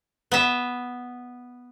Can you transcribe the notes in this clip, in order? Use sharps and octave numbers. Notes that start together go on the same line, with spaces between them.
B3 E5